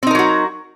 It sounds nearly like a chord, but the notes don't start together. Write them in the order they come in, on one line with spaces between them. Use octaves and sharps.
C4 D#4 A#4 F#3 F#4